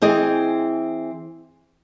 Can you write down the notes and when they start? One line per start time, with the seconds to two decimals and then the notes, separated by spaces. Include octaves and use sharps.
0.02 E3 C4 G#4 D#5